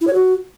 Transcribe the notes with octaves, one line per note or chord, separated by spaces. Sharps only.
E4
C#5
F#4